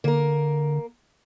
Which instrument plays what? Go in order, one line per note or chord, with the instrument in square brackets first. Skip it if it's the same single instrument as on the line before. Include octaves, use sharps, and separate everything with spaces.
[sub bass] D3 [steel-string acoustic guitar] A#3 A#4